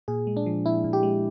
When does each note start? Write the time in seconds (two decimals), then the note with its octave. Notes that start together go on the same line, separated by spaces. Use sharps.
0.08 A#2 G#4
0.27 G#3
0.37 D4
0.46 F3
0.65 A#2 E4
0.84 A#2
0.93 G4
1.03 G#3